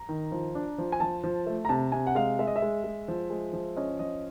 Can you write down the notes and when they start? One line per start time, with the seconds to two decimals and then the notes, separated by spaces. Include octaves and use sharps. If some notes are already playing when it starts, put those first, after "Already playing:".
Already playing: A#5
0.09 D#3
0.32 F3
0.55 D4
0.78 F3
0.92 G#5
1.00 F3 A5
1.24 F3
1.46 A3
1.65 A#5
1.69 C3 A5
1.92 C3 G#5
2.07 F#5
2.15 G#3 F5
2.39 G#3 E5
2.47 D#5
2.56 E5
2.62 G#3
2.84 G#3
3.08 F3
3.30 G#3
3.53 F3
3.77 C#4 D#5
3.99 F3 D#5